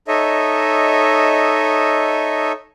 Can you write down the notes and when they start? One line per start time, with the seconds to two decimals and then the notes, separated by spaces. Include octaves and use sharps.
0.08 D#4 A4 C#5 D#5 E5